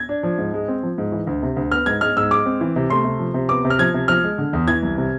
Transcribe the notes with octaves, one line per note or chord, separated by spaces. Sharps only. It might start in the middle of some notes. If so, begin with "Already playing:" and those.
Already playing: G#6
D4
F3
G#2
G#3
C4
F3
G#2
E3
D2
C3
D2
B3 F6
G#2 G#6
G#3 F6
G#2 E6
G#3 D6
C4
E3
C3
A3 C6
C3
F3
C3
B3 D6
C3
F6
F3 G#6
C3
F3 F6
G#3
D3
E2
E3 G#6
C2
C3